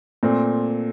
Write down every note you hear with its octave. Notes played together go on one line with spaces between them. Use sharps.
A#2 A3 C4